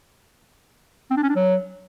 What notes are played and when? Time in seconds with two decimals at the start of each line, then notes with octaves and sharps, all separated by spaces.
1.11 C4
1.17 D4
1.23 C#4
1.29 D4
1.35 F#3